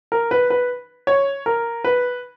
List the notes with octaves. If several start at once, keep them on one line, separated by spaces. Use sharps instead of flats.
A#4
B4
B4
C#5
A#4
B4